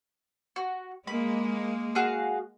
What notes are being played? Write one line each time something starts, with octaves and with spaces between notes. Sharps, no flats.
F#4
G#3 A#3 B5
F#4 G#4 F5